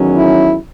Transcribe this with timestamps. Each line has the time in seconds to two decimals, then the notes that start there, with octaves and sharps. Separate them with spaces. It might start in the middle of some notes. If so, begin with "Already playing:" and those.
Already playing: E2 D#3 F#3 C#4
0.15 E4